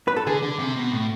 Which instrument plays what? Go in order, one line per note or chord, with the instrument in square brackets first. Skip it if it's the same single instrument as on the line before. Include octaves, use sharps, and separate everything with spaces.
[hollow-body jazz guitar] B4
A4
[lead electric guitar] D3 [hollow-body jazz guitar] G#4
[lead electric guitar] D3
C3
B2
A2